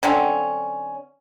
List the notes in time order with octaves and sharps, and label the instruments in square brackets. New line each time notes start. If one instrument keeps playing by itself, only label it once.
[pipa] D3 F#3 C4 C#4